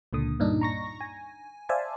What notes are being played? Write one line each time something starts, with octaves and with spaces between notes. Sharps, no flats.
C#2 A#2 D3 D#6
G2 A#2 D4 D#4
A#5 C#6 A#6
G#5
C5 D5 E5 F5 G#5 A5